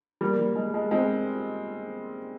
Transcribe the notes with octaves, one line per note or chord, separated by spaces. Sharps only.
G3 A#3
G3
G#3
G#3
G#3 C4